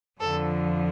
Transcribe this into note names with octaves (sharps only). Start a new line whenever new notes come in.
F2 D3 F3 A4